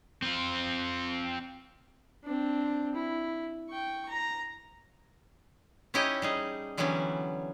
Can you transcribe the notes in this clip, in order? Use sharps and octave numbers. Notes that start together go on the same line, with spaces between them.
C4 F4
C4 D4
E4
G5 C#6
A#5
C#4 D#4 E4 G4 C#5 D#5
G3 D#4 G#4
D3 E3 F#3 G3 B3 C#4